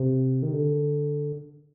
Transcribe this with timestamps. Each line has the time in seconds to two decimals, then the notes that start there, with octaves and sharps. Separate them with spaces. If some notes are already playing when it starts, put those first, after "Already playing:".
Already playing: C3
0.43 D#3
0.53 D3